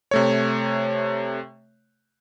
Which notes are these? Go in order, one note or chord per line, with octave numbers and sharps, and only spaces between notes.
C3 A3 C#5